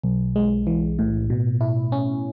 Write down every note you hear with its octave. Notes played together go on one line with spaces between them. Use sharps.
B1
G#3
E3
A2
B2
E4
C#4